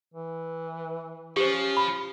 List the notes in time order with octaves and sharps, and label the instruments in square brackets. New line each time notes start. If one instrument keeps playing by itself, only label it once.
[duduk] E3
[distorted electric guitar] F3 [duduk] C#4 [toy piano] G4 C5
[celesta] B5